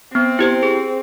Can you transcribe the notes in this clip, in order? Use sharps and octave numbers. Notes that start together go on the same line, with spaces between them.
B3 C4
E4 G4 C5
G#4